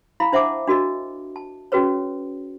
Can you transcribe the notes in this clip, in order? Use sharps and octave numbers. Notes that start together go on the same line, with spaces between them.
E4 F5 A#5 B5
D4 C5 E5 F#5 A5 D6
D4 F#4 A#4 D#5
A5
C#4 F#4 G#4 B4 C#5